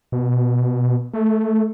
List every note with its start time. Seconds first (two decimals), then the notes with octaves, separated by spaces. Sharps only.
0.12 B2
1.13 A3